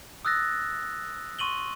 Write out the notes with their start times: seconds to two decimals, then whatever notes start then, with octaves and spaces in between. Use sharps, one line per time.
0.25 D#6 E6 F#6 A6 A#6
1.39 C6 C#6 D#7 F#7 G7